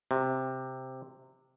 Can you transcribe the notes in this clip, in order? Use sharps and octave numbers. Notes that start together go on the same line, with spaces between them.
C3